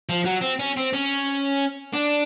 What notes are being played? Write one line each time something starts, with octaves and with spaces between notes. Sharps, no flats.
F3
F#3
C4
C#4
C4
C#4
D4